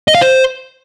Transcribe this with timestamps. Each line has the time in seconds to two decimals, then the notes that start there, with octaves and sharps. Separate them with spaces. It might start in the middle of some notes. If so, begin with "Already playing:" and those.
0.08 D#5
0.15 F5
0.21 C5